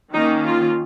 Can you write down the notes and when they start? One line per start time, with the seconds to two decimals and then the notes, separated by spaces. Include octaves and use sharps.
0.12 D#3 A#3 C#4 D#4
0.45 F4